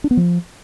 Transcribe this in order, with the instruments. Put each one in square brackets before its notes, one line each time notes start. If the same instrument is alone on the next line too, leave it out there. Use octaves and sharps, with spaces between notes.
[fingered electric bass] D4
B3
F3